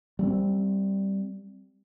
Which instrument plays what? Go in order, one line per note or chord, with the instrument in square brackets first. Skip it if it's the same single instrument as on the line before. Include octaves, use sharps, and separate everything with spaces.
[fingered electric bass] G3 A3 C4